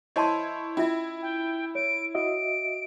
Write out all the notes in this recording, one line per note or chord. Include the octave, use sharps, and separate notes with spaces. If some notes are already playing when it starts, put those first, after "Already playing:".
E4 C5 C#5 D#5 A5 C6
C#4 E4 F4 E5
G5
C#5 D7
F#4 D#5 E5 D7